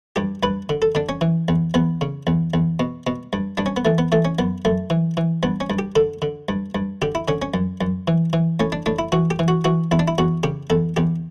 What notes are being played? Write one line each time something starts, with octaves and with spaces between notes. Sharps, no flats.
G2 G4
G2 B4
D3
A4
D3 D4
C#4
E3
E2
E2 B3
C#3
E2
E2
B2
B2
G2
G2 D4
C#4
B3
E3 A3
B3
E3 A3
C#4
F#2 B3
F#2 A3
E3
E3
G2 B3
C#4
G2
G4
D3 A4
D3
G2
G2
D3 G4
E4
D3 C#4
C#4
F#2
F#2
E3
E3
A2 C#4
D4
A2 D4
E4
E3 F#4
G4
E3
F#4
E3 F#4
E2 E4
D4
E4
E2 F#4
C#3 G4
E2 A4
E2 G4